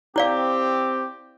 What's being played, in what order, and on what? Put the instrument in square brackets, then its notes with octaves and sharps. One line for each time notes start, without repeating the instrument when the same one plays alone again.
[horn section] C4 G4 [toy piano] E4 D5 F5